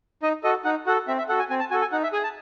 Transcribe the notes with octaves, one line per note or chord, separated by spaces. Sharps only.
D#4 D#5
F#4 A4 D#5
D#4 F#5
F#4 A4 F#5
C4 E5
E5
F#4 A4 F#5
G#5
C4 G#5
A5
F#4 A4 G#5
G#5
D#4 F#5
E5
G#4 G#5
A5